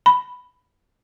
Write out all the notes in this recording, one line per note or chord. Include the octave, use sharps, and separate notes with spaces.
B5